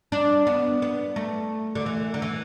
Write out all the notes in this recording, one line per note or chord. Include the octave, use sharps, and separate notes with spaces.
D4
B3
B3
A3
D3
E3
D3
E3